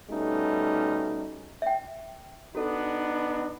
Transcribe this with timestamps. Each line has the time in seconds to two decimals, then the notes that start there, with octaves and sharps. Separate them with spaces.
0.10 B2 G3 A3 C#4 D#4
1.62 E5 G5
2.55 B3 D4 D#4 F#4 A4